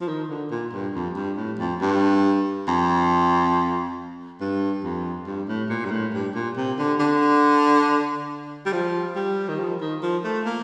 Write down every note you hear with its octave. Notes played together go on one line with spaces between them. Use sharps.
F3
D#3
D3
A#2
G2
F2
G2
A2
F2
G2
F2
G2
F2
G2
A2
A#2
G2
A2
G2
A#2
C3
D3
D3
G3
F3
G3
D#3
F3
D#3
F3
A3
A#3